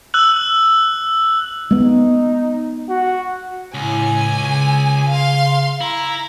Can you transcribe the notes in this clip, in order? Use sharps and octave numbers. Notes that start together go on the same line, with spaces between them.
E6 F#6 F#7
G#3 B3 D#4
F#4
C#2 A2 G#5
C#3
F5 C6
E4 A#5